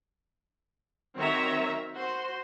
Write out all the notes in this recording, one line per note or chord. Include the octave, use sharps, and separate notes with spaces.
D#3 F#3 C4 C#5 E5 A#5
F#4 C5 C6